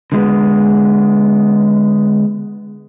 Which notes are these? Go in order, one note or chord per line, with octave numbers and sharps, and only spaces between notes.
D3 G#3 A#3 B3